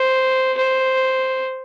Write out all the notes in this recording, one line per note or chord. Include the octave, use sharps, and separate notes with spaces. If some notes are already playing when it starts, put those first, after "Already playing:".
Already playing: C5
C5